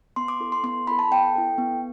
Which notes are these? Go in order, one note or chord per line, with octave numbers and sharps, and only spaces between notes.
B3 C6
D6
E4 A4
C6
B3 C6
E4 A4 B5
A5
B3 G5
E4 A4
B3